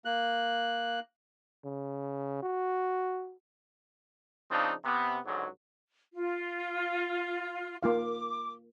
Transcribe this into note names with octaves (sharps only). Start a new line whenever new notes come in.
A#3 F#6
C#3
F#4
C#3 F3 C4 D4 D#4
C3 B3
C#2 G#2 D3 F#3
F4
A#3 F4 F5 D6